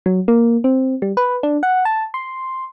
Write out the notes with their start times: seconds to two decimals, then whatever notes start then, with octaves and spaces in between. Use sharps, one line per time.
0.06 F#3
0.28 A#3
0.64 C4
1.02 G3
1.17 B4
1.43 D4
1.63 F#5
1.85 A5
2.14 C6